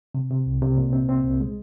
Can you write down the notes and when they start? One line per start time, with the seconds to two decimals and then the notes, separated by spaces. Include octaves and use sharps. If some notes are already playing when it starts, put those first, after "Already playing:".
0.15 C3
0.31 C3
0.46 C2
0.62 C3
0.78 A#2
0.93 C4
1.09 C4
1.25 C2
1.40 G#3